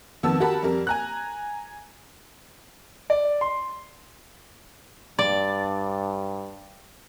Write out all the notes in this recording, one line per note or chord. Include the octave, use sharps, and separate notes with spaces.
F2 D#3 B3 A5 E6
F#4 G4 A#4 F#5 A5 B5
F2 G3 A#4
G#5 A#5 F#6
D5
C6
G2 D5